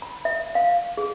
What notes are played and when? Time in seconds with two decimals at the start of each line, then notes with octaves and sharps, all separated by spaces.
0.02 B5
0.25 E5
0.55 F5
0.97 G#4